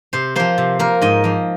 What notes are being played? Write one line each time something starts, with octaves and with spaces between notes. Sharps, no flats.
C3 C5
F3 A#3 C5
C3
F3 A#3 A#4
G#2 D#5
F3 A#3